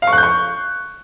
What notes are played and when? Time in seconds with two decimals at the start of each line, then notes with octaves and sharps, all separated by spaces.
0.02 F5
0.07 C#6
0.13 F#6
0.18 G6
0.23 C#6